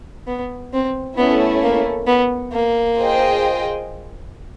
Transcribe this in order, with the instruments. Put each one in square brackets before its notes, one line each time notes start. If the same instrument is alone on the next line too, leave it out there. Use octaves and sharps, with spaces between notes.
[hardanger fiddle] B3
C4
[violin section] A3 C#4 E4 [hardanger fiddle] B3
[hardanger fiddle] A#3
B3
A#3
[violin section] F4 G#4 C5 D#5 G5